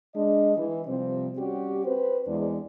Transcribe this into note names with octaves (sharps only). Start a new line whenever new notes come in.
G#3 D4 D#5
E3
C3 F3 G3 C4
G3 C#4 F#4 G4
C4 B4 C5
E2 G#3 D4